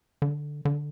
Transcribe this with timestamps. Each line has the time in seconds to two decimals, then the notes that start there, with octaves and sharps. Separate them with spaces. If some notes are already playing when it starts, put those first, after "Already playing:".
0.22 D3
0.65 D3